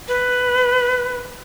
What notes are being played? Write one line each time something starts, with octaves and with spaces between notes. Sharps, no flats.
B4